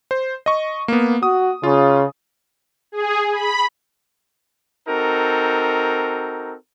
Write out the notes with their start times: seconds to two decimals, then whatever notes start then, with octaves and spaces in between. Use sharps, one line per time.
0.11 C5
0.46 D#5 C#6
0.88 A#3 B3
1.23 F#4 D#6
1.63 C#3 F4
2.92 G#4
3.32 B5
4.89 C4 D#4 F#4 A4 A#4